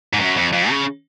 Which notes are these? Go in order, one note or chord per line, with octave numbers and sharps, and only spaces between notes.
G#2
F#2
F2
F2
C#3